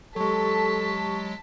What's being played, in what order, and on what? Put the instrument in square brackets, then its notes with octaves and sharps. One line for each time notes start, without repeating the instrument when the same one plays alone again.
[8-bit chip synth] F#3 G#3 [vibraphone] G4 C#6 [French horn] A4 [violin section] A5 B6